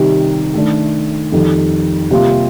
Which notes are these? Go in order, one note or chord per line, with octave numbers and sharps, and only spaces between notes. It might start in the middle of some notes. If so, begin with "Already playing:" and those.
Already playing: C3 D#3 G3
D#3 A3 D4
F2 D#3 G3
C3 G3 A#3 F4